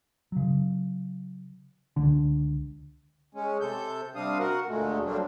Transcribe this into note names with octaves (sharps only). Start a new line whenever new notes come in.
C#3 F#3
C#2 D3 D4
G#3 C#4
C3 A4 G6
C3 G3 C4 D4 F5 D#6
F#4 A#4 F#5
D2 A#2 G#3 A3
F#3 G3 A3 A#3 C4 D4